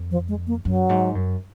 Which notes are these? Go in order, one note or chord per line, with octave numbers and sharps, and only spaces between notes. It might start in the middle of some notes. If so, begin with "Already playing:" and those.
Already playing: F2
F3
G#3
A#3
F#2 F#3
G#2
F#2